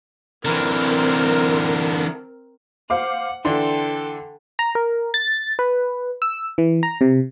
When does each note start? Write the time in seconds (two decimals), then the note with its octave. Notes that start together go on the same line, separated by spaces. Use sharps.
0.45 D3 E3 C4 A#4
2.90 C5 F5 F#5 D6
3.45 D3 E3 D4 A4 G5 C6
4.59 A#5
4.75 A#4
5.14 A6
5.59 B4
6.22 E6
6.58 E3
6.83 A#5
7.01 C3